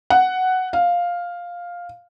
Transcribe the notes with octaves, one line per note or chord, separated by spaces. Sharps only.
F#5
F5